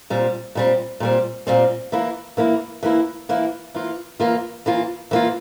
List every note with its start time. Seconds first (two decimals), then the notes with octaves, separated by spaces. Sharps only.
0.10 A#2 G3 C4
0.55 A#2 G3 C4
1.00 A#2 G3 C4
1.47 A#2 G3 C4
1.92 E3 A#3 E4
2.37 E3 A#3 E4
2.83 E3 A#3 E4
3.29 E3 A#3 E4
3.74 E3 A#3 F4
4.20 E3 A#3 F4
4.66 E3 A#3 F4
5.11 E3 A#3 F4